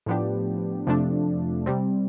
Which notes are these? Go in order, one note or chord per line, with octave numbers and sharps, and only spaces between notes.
A2 F3 B3 D4 G4
F2 C3 F3 A3 D4
C3 G3 C4